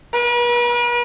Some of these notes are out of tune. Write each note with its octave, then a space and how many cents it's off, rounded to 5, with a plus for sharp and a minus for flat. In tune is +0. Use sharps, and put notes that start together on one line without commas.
B4 -45